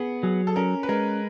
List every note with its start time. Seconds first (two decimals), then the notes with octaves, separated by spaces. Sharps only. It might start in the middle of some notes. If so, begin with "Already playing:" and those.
Already playing: B3 G#4
0.23 F#3 G#4
0.47 A4
0.56 C#4 A#4
0.83 B4
0.89 G#3 A#4